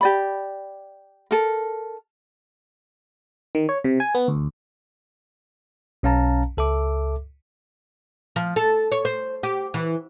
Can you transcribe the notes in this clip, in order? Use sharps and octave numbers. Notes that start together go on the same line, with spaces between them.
G4 D5 B5
A4 A#4
D#3
C#5
C3
G#5
B3
D2
B1 C#4 F5 A5 A#5
C#2 A4 E5 D6
F3
A4
C#5
C5
G4
E3